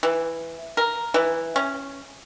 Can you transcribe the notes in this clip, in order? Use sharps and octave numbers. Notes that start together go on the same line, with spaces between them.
E3
A#4
E3
C#4